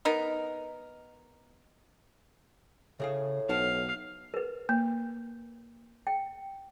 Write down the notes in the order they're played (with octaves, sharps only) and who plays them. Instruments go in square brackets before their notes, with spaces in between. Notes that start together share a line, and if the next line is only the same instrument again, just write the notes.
[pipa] B3 D#4 A#4
[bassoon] A2 [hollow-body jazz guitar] C#3 G#4 F5
[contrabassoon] B1 [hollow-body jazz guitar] C5 F#5 A5 [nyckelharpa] F5
[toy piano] A#4 B4
[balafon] A#3
[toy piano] G5